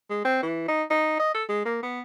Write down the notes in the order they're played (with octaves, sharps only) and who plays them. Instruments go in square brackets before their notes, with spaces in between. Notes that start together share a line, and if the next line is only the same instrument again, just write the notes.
[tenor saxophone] G#3
C4
E3
D#4
D#4
D#5
A4
G#3
A#3
B3